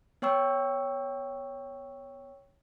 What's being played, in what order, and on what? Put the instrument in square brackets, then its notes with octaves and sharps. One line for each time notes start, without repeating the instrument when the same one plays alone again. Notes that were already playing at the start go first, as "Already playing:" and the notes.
[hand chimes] B3 C#5 G5 C#6 E6